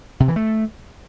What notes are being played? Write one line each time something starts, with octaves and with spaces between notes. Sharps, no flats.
C3
E3
A3